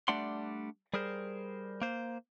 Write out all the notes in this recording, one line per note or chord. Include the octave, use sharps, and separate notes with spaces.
G3 A3 D4 D5 F#5 C6
G3 G#4 A#4 C5
A#3 C5